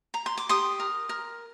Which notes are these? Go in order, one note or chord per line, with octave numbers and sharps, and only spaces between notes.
A#5
C6
D6
G4 C6 D#6
A#4
A#4